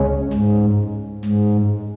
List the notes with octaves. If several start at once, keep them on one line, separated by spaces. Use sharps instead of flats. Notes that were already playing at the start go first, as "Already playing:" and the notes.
Already playing: C#2 C#3 G#3 C#4
G#2
G#2